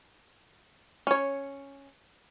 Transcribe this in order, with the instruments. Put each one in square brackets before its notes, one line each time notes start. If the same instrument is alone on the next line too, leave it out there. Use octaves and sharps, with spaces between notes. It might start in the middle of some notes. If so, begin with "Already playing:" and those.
[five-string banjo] C#4 C#5